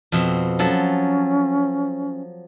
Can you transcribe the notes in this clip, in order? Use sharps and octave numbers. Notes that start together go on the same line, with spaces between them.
F2 B2 C4
F3 F#3 C#4 A4